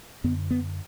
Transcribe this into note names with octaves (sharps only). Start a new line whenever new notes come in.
F#2 D3 B3
B3